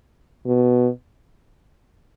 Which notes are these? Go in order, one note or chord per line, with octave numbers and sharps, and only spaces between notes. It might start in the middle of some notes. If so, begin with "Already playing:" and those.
B2